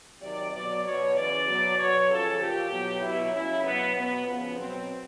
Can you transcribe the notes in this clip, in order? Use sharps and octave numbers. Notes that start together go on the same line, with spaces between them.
C3 D#3 F#3 D5
B2 F#3 D5
B2 F#3 C#5
C#3 E3 D5
B2 F#3
B2 F#3 C#5
C#3 F3 A4
A#2 F3 G4
B2 F#3
B2 F#3 E4
C#3 F#3 E4
B2 F#3 B3
B2 F#3 B3
C#3 F3 B3
B2 F#3 C4